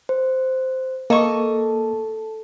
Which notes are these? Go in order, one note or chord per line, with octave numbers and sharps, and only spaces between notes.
C5
A#3 A4 D#5 A5 C#6